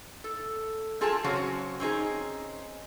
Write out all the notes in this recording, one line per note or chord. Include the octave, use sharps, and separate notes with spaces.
A4
C4 F4 G#4 A4 G5 A5
C#3 F#3 C4 C#4 F#4
C4 C#4 D#4 G#4